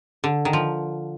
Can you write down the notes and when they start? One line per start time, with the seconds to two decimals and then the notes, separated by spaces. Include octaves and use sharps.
0.24 D3
0.45 D#3
0.53 F3